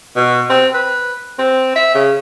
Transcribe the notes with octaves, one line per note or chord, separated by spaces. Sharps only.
B2
C4
B4
C4
E5
C#3